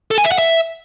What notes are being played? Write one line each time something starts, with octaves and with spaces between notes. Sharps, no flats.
A4
G#5
E5
F#5
E5